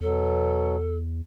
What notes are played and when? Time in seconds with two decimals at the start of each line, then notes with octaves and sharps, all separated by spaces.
0.01 E2 B2 F#3 A4